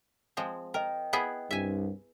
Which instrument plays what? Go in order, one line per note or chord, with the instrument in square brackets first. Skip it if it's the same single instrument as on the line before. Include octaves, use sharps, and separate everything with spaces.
[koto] F3 G#3 C4
[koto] A#4 [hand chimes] D#5 G5
[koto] B3 E4 G#4
[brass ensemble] C2 G2 [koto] E5 G#5